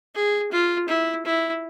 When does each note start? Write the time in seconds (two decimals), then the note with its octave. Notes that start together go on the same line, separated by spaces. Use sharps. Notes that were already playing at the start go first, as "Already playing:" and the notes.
0.15 G#4
0.52 F4
0.88 E4
1.25 E4